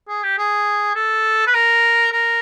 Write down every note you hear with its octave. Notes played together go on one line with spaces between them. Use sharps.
G#4
G4
G#4
A4
B4
A#4
A#4